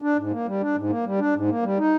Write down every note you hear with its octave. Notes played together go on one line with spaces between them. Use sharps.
D4
G#2
A#3
G3
D4
G#2
A#3
G3
D4
G#2
A#3
G3
D#4